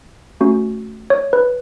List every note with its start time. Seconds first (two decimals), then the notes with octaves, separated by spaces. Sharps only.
0.40 A3 C#4 F#4
1.10 C#5
1.33 B4